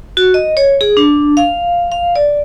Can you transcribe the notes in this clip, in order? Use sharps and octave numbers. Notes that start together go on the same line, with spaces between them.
F#4
D#5
C#5
G#4
D4
F5
F5
D5